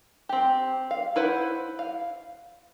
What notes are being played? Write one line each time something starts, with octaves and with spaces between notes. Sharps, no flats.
C4 G4
F5
E4 B4 C5 F#5
F5